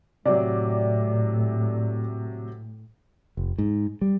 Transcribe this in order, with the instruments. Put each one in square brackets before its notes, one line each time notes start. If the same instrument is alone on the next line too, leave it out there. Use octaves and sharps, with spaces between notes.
[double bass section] A2 [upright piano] C3 F#3 [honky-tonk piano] D5
[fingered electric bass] F1
G#2
G3